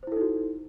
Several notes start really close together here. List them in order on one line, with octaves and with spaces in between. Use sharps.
C5 E4 A4 D#4 F#4